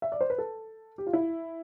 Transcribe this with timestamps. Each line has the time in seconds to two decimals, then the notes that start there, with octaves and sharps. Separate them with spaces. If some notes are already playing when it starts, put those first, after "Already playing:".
0.02 E5
0.12 D5
0.21 C5
0.30 B4
0.38 A4
0.98 G4
1.07 F4
1.13 E4